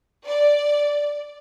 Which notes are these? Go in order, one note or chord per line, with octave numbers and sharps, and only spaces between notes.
D5